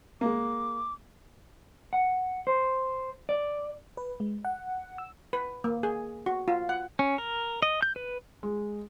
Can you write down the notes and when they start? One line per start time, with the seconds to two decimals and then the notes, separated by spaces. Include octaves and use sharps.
0.21 G#3 A#3 D6
1.93 F#5
2.47 C5
3.29 D5
3.97 B4
4.20 G#3
4.45 F#5
4.98 E6
5.33 B4
5.64 A#3
5.83 G#4
6.26 F#4
6.48 F4
6.69 F#5
6.99 C#4
7.18 A#4
7.62 D#5
7.82 G6
7.96 B4
8.43 G#3